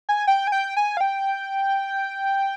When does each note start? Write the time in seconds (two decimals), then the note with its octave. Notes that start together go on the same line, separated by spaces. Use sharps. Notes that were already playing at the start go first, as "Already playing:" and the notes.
0.09 G#5
0.27 G5
0.47 G#5
0.52 G5
0.77 G#5
0.97 F5
1.01 G5